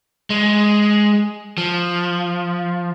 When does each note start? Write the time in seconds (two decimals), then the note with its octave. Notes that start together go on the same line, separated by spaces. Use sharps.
0.30 G#3
1.58 F3